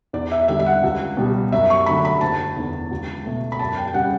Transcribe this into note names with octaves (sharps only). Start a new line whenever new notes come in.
E2 D5
E5
D3 G3 E5
E5
F#5
C#2
B2 G3
F#2 E5
C#6
D3 F#3 A3 B5
B5
F#1 A5
E2 D3
C#2
B2 A3
B5
F#2 A5
G5
G5
C#3 G3 F#5